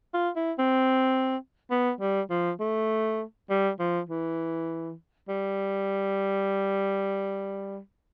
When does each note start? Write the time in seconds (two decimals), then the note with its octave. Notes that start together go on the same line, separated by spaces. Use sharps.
0.14 F4
0.36 E4
0.58 C4
1.71 B3
2.00 G3
2.30 F3
2.59 A3
3.50 G3
3.79 F3
4.09 E3
5.28 G3